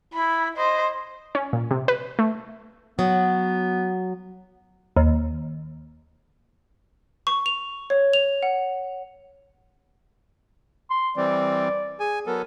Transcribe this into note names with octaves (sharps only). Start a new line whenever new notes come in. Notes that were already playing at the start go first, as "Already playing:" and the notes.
E4 B5
C5 D#5
C#4
A#2
C3
B4
A3
F#3 B3
D#2
C#6
F7
C#5
F7
F#5
C6
E3 G3 C4 D5
G#4 G#5
F#3 B3 A4 A#4